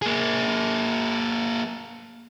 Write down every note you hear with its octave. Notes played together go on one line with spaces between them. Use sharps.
A#3 G#4